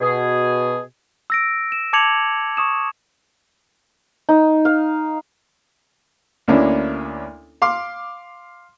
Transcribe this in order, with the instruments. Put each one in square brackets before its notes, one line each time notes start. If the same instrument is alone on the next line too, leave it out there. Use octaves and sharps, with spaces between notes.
[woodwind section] B2 G#4
[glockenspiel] E6 A#6 D7
E7
A5 D6 G#6 C#7 F7 F#7
C#6 D#6 E7
[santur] D#4
F5
[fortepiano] D2 A#3 C#4 D4 E4
F5 C6 D6